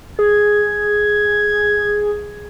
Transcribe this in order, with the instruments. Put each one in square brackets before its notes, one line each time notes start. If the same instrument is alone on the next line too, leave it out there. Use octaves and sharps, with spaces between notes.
[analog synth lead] G#4 [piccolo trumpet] G#6